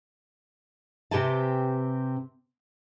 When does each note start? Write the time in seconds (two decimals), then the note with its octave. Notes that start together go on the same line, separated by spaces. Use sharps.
1.11 C3 C4 G4 B4 G#5 A5